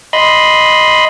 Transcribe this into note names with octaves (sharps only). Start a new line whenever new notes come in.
D#5 B5 C6